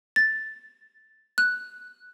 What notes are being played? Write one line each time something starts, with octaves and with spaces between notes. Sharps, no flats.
A6
F#6